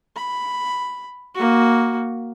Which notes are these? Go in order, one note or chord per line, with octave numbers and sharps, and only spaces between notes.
B5
A#3 F#4